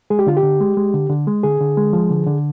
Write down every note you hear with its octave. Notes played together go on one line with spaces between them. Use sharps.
G#3 G#4
G4
D3 F4
G4
D3
G#3
G#3
D3
D3
G#3
D3 G#4
D3
G#3
F3
D3
D3